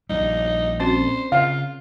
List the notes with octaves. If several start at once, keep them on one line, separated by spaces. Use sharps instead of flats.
A#1 G3 D#4
C4 C#4 F#4 C5
C#3 F4 F5